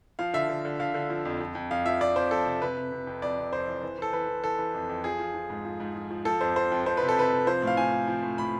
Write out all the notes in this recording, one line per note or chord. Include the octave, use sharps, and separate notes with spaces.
F3 F5
D3 E5
D3
D3
D3 F5
D3
F3
F2
F2
F2
F2 F5
F3 E5
F2 D5
F2 C5
F3 A4
C3
C3 B4
C3
C3
F2
F2 D5
C3
F2 C5
E3
E3
E3 A4
E3 B4
E3
E3 A4
E3
F2
F2
F3 G#4
F3
F3
G#2
F3
G#2
F3
F3
F3 A4
F2 C5
F2 C5
F2
F2 C5
C3 B4
A4
C3 B4
C3
F3 C5
A2 F5
F3 G#5
F3
F3
A2
A2 B5